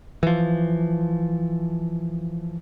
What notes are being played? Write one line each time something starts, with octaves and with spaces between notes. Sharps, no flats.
E3 F3